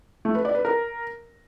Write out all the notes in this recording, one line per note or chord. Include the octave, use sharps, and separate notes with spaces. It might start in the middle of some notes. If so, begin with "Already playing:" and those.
A3
B4
D5
B4
A#4